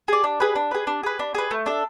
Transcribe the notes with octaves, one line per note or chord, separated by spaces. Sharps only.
G#4 D5
D4
G#4 B4
D4
G#4 B4
D4
G#4 B4
D4
G#4 B4
A3
D4 A4